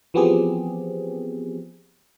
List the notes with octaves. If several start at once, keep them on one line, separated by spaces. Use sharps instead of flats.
E3 F3 B3 C4 G4 G#4